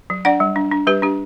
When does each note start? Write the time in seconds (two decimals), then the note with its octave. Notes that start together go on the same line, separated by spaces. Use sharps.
0.10 F#3
0.25 D4 D5 F#5
0.40 G3
0.56 D4
0.72 D4
0.87 G3 G4 B4
1.02 D4 G4